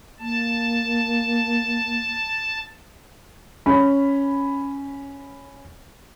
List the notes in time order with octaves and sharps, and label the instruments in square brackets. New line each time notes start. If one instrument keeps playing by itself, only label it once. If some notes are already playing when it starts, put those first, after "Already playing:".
[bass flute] A#3 [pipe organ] A5
[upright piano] C#4 B5